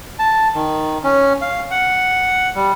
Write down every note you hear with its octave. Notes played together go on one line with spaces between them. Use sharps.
A5
D#3
C#4
F5
F#5
G3